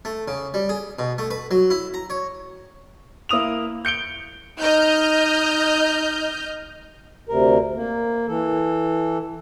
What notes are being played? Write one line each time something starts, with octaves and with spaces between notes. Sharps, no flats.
A3
C#3
G3
G#4
B2
A3
B4
F#3
E4
A#5
C#5
A#3 E4 D#6 F7
G6 C#7 D7 G7
D#4 D#5 F6 G6
D2 C3 A#4
A#3
E3 A4